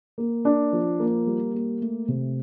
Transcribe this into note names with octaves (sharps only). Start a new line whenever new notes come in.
A#3
D4
F3
A#3
G3
A#3
A3
C3